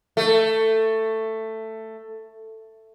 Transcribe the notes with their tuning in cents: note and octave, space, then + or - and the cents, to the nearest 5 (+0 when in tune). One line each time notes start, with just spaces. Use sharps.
A3 +10